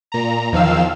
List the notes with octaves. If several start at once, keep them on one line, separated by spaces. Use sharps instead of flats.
A#2 A#5
E2 D#3 F3 F5 E6